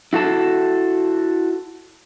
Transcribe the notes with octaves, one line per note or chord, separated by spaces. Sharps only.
E4 F#4 A4 A5